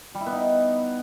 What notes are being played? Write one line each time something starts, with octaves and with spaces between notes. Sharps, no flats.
G3
E4
B3
D#4